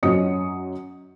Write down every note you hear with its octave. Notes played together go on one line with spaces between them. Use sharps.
F#2 F#3 C#5 D#5 D#6 C#7